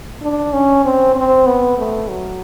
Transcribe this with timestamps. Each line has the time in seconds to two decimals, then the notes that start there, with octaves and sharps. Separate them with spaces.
0.22 D4
0.53 C#4
0.85 C4
1.16 C4
1.47 B3
1.78 A3
2.09 F#3